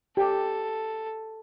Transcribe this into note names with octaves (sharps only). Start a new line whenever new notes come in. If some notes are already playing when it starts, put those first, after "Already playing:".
G4 A4